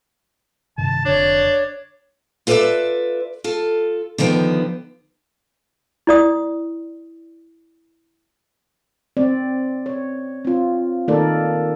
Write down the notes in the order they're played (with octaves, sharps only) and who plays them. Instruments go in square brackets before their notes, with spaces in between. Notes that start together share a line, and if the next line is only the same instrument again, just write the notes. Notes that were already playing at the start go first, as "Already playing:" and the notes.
[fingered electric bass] G2 C3 D#3 [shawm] A5
[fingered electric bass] F1 B1 D3 [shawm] D4 [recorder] C#5
[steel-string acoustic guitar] F4 A4 B4 C#5 D5 E5
F4 A4
D3 D#3 F3 B3 G5
[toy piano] E4 D5 D#6
[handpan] C4 D5
C#5
C4 F4
D#3 A#3 D#4 A4 A#4 D5